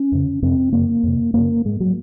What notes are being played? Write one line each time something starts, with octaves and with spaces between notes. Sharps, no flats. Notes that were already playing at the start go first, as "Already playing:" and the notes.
Already playing: C#4
F2 C#3
F2 C3 C4
F#2 C#3 A#3
F2 C3
F#2 C#3 A#3
G#2 G#3
F#3